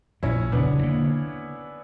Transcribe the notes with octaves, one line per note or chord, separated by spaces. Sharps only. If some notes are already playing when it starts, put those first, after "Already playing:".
A#1 A#2 F#3 C#4 E4
E1 D2 C#3 F#3 B3 D4
D3 A#3